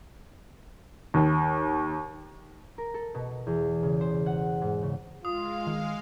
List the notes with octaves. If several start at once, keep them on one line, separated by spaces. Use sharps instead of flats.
D#2
A#4
A4
B2
E2
C#3
C5
F#5
G#2
C#3
G#3 F4 F5 D#6
D#3